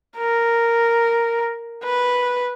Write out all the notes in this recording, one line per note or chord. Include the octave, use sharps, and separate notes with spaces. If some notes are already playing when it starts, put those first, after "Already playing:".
A#4
B4